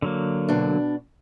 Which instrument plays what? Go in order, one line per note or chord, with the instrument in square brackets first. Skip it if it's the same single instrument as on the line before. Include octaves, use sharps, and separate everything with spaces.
[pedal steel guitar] D3 F#3 A#3
[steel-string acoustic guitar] B2 D4